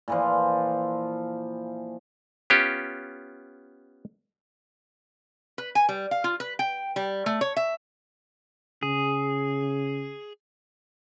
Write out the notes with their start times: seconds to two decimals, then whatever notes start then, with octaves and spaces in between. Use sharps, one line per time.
0.08 A#2 E3 F3
2.50 B3 C#4 F4 G4
5.58 B4
5.75 G#5
5.89 G3
6.11 F5
6.24 F4
6.40 B4
6.59 G5
6.96 G3
7.26 A3
7.41 C#5
7.56 E5
8.83 C#3 G#4